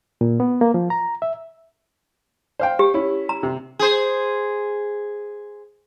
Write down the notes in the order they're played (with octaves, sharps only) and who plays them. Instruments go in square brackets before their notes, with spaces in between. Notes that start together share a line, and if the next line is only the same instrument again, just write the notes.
[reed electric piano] A#2
B3
A#3
F3
A#5
E5
[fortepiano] C5 F5 G5
[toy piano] G4
[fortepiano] C#4 E4
[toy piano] A#5
[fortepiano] C3
[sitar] G#4 C5